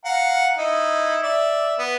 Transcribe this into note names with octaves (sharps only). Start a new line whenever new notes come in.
F5 F#5 A#5
D#4 E4
D5 E5
B3